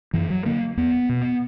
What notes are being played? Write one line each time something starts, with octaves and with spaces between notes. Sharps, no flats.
F#2 E3
F#3
D3 A#3
E2 B3
B2